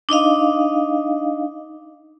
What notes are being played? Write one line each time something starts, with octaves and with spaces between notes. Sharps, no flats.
D4 D#4 D#5 F5